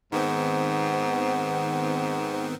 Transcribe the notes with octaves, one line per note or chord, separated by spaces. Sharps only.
G#2 D#3 B3 C4 F#5